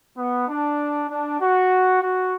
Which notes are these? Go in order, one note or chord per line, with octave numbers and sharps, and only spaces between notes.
B3
D4
D4
F#4
F#4